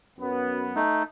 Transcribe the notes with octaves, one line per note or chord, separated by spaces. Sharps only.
F#2 B3
A3 D#4